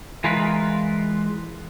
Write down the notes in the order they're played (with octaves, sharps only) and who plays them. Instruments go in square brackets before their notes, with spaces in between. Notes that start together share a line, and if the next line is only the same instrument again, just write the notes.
[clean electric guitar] E3 G#3 F4 A#4 B4